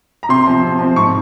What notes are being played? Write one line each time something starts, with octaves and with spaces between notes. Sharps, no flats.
A#5
C3 C6
F3 C4
C3
F3 C4
G#2 C#6